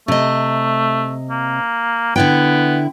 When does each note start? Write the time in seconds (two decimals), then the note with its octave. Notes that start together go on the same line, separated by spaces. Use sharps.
0.08 C3 A3 D#5
1.30 A#3
2.16 D3 B3 E4 G5